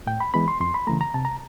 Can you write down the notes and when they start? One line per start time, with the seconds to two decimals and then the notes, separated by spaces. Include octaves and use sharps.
0.07 A2 G5
0.20 B5
0.34 E3 G#3 B3 B5
0.48 C6
0.60 F2 C6
0.74 B5
0.87 C#3 E3 A3 A#5
1.01 A#5
1.14 C3 A5
1.25 A#5